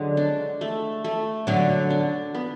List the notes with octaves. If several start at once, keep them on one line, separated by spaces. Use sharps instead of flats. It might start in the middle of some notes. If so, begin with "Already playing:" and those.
Already playing: D3 F#3 G#3
D4
A3
A3
D3 F#3 D4
D4
B3